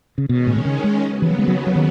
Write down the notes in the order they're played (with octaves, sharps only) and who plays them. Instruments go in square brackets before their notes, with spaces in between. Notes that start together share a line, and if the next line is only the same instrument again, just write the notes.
[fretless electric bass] C#3
[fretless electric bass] B2 [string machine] D#3 G#3 C#4
[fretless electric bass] A2
B2
C#3
G#3
[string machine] D#2 C#3 F#3 B3
[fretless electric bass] E3
F#3
G#3
F#3
F#3
D#3